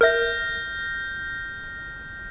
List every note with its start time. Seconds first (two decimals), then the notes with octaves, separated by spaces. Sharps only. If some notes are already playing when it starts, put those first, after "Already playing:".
0.01 A#4 E5 F6 G6 A#6